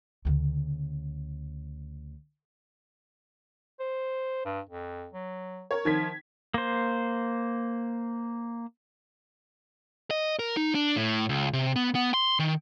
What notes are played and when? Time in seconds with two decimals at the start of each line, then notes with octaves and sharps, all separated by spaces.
0.25 D2 C#3
3.80 C5
4.45 G2
4.69 F2
5.13 F#3
5.71 A#4 C#5
5.85 D#3 F3 G#6 B6
6.54 A#3 C5
10.11 D#5
10.39 A#4
10.57 D#4
10.75 D4
10.96 A2
11.29 C#2
11.53 C3
11.76 B3
11.95 B3
12.14 C6
12.39 D#3